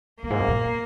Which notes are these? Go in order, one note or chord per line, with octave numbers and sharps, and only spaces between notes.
F#2 A#3
G#2
F#2
A#2